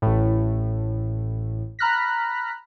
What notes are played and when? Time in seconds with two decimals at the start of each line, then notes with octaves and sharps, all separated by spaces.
0.02 A1 A2
1.79 A#5 B5 F6 F#6 A#6 B6